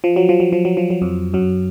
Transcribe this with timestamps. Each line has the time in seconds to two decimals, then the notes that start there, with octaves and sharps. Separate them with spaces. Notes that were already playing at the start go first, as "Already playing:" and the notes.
0.04 F3
0.16 F#3
0.29 F3
0.40 F#3
0.53 F3
0.65 F#3
0.77 F3
0.90 F#3
1.02 F2 F3
1.33 F#2 F#3